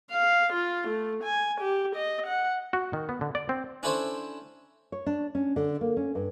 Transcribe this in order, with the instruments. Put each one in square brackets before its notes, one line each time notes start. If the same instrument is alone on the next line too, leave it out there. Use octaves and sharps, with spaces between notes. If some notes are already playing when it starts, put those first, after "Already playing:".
[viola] F5
F4
A3
G#5
G4
D#5
F#5
[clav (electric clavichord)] F#4
D#3
B3
D3
D5
C4
[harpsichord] C#4 D4 E4 A4 C5 C#5
[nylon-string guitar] C#5
D4
C#4
D3
A#3
C#4
G2